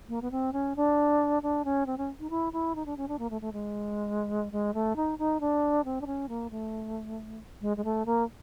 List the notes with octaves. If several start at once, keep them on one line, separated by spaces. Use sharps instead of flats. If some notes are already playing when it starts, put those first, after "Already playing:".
A#3
B3
C4
C#4
D4
D4
C#4
C4
C#4
D#4
E4
E4
D#4
D4
C#4
D4
A#3
A3
A3
G#3
G#3
A3
D#4
D#4
D4
C4
D4
C#4
A#3
A3
G#3
G#3
A3
A#3